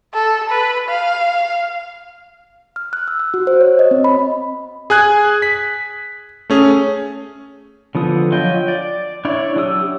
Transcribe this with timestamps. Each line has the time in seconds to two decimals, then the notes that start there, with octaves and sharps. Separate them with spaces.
0.14 A4
0.49 B4
0.89 F5
2.76 F6
2.93 F#6
3.08 E6
3.20 E6
3.34 F#4
3.47 C5
3.61 C#5
3.79 D#5
3.91 C4
4.04 B5
4.90 G#4 G#5 F#6 G#6
5.42 B6
6.50 A3 C#4 G#4
7.95 D3 F3 B3 D#6
8.32 F3 F#3 F4 D#5 G5
8.68 D5
9.25 D4 E4 C#5 D5
9.56 F#3 D4 G4 D#6 E6